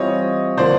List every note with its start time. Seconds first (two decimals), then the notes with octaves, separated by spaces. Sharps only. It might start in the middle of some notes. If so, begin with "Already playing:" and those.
Already playing: E3 G3 C4 F4 C#5 D#5
0.57 D3 F3 A#3 C5 D5